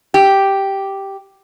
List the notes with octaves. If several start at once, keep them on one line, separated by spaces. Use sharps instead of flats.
G4